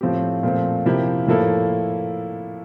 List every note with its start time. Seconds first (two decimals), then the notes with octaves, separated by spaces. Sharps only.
0.01 A2 F3 C4 G4
0.43 A#2 F3 A3 C4
0.86 C3 F3 A#3 E4 G4
1.27 A2 F3 A#3 E4 A4